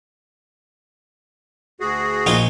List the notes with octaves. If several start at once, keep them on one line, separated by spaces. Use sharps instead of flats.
D2 F#4 G#4
A#1 D#4 F4